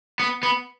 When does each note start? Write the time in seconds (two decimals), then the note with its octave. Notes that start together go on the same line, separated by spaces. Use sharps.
0.20 B3
0.43 B3